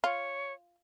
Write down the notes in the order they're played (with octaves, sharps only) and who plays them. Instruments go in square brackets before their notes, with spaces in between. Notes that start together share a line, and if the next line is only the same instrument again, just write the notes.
[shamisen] F4 [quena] C#5